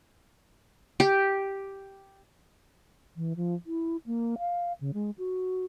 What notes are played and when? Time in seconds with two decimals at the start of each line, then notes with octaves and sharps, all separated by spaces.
1.00 G4
3.16 E3
3.36 F3
3.66 E4
4.06 A#3
4.39 F5
4.81 C#3
4.94 G#3
5.18 F#4